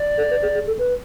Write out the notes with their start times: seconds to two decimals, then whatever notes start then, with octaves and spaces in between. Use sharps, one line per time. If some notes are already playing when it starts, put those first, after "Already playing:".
Already playing: D5
0.18 A4
0.31 B4
0.42 G#4
0.55 G#4
0.67 A4
0.79 B4